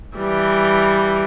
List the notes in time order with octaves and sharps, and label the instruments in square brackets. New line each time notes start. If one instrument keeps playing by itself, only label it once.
[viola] E3 G3